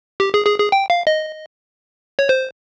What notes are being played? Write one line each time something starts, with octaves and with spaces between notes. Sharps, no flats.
G4
G#4
G#4
G#4
G5
F5
D#5
C#5
C5